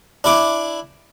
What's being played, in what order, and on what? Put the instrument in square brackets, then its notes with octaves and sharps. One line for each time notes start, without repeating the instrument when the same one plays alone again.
[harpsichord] D4 E4 D6